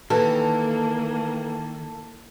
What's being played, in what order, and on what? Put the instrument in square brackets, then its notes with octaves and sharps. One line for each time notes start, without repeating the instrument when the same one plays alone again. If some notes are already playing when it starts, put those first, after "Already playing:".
[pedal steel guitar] D#3 [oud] E3 [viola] A#3 [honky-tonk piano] A4